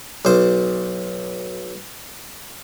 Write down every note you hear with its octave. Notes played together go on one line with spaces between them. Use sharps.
B1 C5